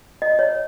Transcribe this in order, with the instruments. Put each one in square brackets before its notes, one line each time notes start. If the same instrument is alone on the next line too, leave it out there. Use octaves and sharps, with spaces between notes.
[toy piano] D#5
C#5